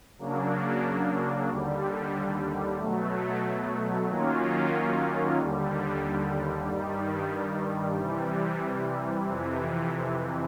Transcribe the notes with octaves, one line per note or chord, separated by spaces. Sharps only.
C#3 F#3 A#3 D4
D#2 D3 G3
B2 F#3 A3
D#3 F#3 A#3 C#4 F4
D#2 D3 G3
G2 D#3 G3
C3 E3 G3
F2 C3 E3